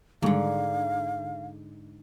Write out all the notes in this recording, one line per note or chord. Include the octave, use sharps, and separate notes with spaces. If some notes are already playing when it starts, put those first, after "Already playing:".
G#2 D3 D#3 G3 G#3 F5